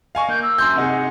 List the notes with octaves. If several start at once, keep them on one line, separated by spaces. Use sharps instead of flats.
D#5 F5 G#5 C#6
A#3 G6
E6
F#2 C6 G6
C3 D#4 G#4 F#5